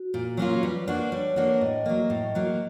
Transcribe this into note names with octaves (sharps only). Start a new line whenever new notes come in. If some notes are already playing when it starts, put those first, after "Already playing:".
Already playing: F#4
A#2
F#3 A#3 C#4 F4
G3 B4
A#3 D4 F#4
G3 C#5
A#3 D4 F#4 D5
A2 D#5
F#3 A#3
A2
F#3 A#3